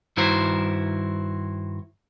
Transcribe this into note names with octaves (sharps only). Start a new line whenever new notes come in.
G2 D#3 E4 F#4 C5 A#5